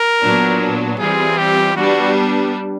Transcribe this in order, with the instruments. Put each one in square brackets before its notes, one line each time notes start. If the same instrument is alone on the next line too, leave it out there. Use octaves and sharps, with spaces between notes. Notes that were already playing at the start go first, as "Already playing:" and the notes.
Already playing: [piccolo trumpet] A#4
[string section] A#2 F#3 B3 D4
[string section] E3 G3 C4 F4 [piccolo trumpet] G#4
[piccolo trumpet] G4
[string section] G3 B3 D4 [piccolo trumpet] F#4